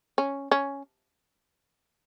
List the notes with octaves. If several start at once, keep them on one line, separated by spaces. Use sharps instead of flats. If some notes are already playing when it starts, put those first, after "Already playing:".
C#4
C#4